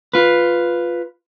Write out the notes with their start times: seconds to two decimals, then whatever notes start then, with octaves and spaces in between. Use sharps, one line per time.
0.14 F4 B4